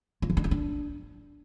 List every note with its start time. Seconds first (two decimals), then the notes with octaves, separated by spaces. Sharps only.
0.22 F4
0.30 F3
0.37 D4
0.44 E4
0.51 D4